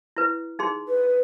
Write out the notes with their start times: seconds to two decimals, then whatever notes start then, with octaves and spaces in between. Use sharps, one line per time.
0.16 E4 B4
0.59 D#4 G#4 C6
0.88 B4